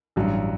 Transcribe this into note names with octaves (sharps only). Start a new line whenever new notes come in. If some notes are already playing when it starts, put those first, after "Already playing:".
A1 G2 F#3